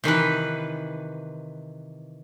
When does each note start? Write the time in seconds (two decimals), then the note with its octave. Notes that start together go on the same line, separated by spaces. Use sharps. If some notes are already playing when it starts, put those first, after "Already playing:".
0.04 C3 D#3 E3 B4